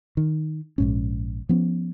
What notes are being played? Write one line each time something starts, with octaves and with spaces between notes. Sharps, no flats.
D#3
A#1 G#2 C#4
F3 B3 C#4